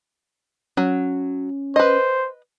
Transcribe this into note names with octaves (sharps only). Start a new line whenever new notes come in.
F#3 C#4
B4 C5 D#5